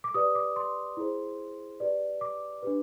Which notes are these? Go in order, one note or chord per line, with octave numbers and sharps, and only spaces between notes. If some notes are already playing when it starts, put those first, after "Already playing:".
D6
G4 B4 D5 D#6
D6
C6
E4 G#4 C5
G4 B4 D5
D6
D4 G4 B4